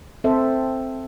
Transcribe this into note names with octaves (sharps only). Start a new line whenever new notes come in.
C4 A4 C5 E5